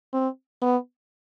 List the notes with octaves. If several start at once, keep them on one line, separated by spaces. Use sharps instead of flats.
C4
B3